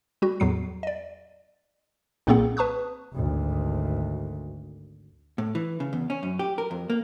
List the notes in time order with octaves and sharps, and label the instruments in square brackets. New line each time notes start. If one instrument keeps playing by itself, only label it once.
[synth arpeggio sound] G3 F#4
E2 A2 F#3 C7
D5 D#5
B1 A#2 A#3 C4 G#4 F#5
B4 A5 C#6 D#6 F#6
[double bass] G#1 D2
[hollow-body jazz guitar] A2
E3
C#3
E2
C#4
F#2
G4
A#4
F2
A#3